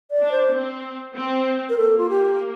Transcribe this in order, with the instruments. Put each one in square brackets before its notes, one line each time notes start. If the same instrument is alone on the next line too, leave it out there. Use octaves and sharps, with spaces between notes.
[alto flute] D5
[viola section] D4
[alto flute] C5
[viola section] C4
C4
[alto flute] A#4
[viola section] A#3 [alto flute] A4
[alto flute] F4
G4